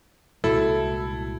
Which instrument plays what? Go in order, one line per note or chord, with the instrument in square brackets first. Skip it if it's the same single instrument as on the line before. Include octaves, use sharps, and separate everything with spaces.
[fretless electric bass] C2 A#2 G#3 [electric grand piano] E4 [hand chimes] F#4 [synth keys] A4